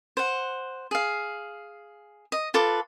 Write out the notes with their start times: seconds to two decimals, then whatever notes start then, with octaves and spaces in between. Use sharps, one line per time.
0.17 C5 F#5
0.91 G#4 F5
2.32 D#5
2.54 F4 A4 B4 D6